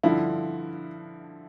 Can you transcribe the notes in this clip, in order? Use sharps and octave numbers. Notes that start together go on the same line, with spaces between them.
G2 D3 F3 E4